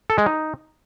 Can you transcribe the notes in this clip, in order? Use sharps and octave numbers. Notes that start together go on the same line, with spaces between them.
A4
G#3
D#4